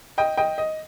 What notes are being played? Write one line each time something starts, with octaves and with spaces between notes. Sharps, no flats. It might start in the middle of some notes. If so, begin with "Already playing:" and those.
D#5 G5
D#5 G5
D#5